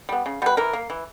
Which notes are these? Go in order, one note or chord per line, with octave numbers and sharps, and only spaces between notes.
G3 B3
C#3
G3 B3 B4
E3 A#4
A#3
E3